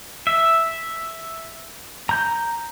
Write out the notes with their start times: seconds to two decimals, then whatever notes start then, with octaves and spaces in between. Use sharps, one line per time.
0.27 E5
2.09 A#5 G6